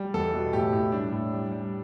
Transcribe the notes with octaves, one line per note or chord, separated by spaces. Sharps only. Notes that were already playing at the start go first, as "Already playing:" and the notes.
Already playing: G3
E2 A4
B2
A2 G4
A2
G3 D4
A2
G3
G3